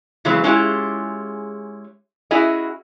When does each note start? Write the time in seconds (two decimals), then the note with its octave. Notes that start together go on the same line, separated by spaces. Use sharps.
0.25 C#3 E3 F#3 G#3 C4
0.44 G#3 C#4 E4 F4 G4 G#4
2.31 C#4 E4 F#4 G#4 D#5